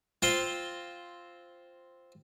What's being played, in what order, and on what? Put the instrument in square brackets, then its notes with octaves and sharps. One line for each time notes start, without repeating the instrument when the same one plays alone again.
[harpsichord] C4 F4 F5 C6